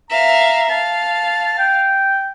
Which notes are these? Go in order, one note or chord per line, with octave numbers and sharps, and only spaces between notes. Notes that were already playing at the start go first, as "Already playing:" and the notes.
E5 F5 A#5
F5 A5
G5